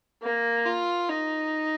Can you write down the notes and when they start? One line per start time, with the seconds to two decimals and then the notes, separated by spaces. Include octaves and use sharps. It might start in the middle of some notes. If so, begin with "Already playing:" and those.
0.23 A#3
0.66 F4
1.09 D#4